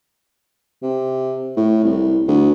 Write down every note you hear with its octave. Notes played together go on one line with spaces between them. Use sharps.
C3
A2
C2
D2